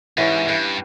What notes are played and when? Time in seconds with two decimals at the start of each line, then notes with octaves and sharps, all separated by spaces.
0.18 G#2 E3 C#4 G4
0.49 G2 B4 F5